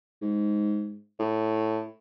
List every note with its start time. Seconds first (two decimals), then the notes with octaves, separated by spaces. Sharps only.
0.22 G#2
1.19 A2